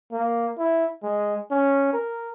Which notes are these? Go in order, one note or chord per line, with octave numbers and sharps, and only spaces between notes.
A#3
E4
G#3
C#4
A#4